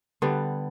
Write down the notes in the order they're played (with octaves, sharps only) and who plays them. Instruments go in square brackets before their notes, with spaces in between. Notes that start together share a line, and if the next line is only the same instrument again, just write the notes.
[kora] D3 G3 B3